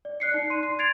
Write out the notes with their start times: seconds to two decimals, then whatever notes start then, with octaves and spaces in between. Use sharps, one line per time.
0.05 D5
0.20 D5 F#6 C7 C#7
0.34 D#4
0.50 C6 D#7
0.63 C6 C7
0.79 G#6 A6 C7 D7 F7